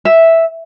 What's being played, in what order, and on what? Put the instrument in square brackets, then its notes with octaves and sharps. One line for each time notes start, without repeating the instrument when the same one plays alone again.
[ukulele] E5